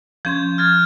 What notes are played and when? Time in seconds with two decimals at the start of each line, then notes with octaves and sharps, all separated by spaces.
0.25 F3 C#4 C6 G6 G#6
0.58 F6 G#6 A6